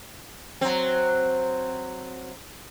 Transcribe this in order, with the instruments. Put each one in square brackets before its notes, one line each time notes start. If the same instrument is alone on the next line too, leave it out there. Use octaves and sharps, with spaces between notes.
[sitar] F#3 C4